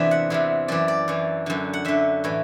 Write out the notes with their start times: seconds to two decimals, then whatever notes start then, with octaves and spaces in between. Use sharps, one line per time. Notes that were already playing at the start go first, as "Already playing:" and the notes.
Already playing: E2 C3 E3 D4 A4 E5
0.11 F#5
0.30 E2 C3 E3
0.68 F#2 E3 D5
0.88 D5
1.08 F#2 E3
1.46 F#2 D3
1.73 F#5
1.85 F#2 D3 E5
2.24 A2 E3